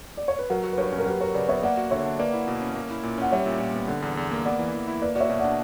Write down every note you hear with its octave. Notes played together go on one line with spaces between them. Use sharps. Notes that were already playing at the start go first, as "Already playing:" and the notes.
D5
C#5
B4
F#3 F#4 A#4
F#4
B4
G2 A#4 C#5
C#4
A#4
F#3 G4 B4
F#4 A#4 C#5
C#3 B4 D5
B3 C#5 E5
A#3 D5 F#5
F#4
D3 C#5 E5
D4
A#3 B4 D5
E4
B2
C#4
A#3
E4
A#2
C#4 F#5
G3 C#5 E5
A#2
A#2
B3
D3
E2
E2
A#3
B3 D5 F#5
E3
E3
E4
A#3 B4 D5
F#4 D5
C#5 E5
B2
D4 D5 F#5